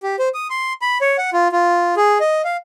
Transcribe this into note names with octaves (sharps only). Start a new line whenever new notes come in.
G4
C5
D#6
C6
B5
C#5
F#5
F4
F4
G#4
D#5
F5